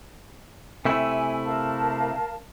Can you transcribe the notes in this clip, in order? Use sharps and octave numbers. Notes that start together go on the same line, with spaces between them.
C3 A3 E4 G#5
A#4 F5 A5